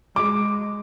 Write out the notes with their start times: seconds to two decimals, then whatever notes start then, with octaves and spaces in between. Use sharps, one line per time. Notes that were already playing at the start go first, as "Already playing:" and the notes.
0.16 G#3 D6